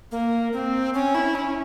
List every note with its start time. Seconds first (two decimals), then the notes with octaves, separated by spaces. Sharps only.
0.11 A#3
0.53 C4
0.94 C#4
1.15 E4
1.35 C#4